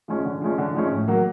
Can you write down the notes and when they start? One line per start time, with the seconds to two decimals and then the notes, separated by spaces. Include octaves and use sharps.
0.08 F3 G#3 C#4
0.25 D3
0.41 F3 G#3 C#4
0.58 D3
0.74 F3 G#3 C#4
0.91 A2
1.08 F#3 A#3